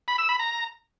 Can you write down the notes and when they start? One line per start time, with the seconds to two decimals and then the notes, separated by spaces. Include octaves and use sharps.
0.08 B5
0.18 E6
0.29 B5
0.39 A#5